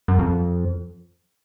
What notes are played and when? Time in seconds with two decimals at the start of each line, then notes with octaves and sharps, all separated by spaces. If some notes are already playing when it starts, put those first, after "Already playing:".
0.08 F#2
0.19 F2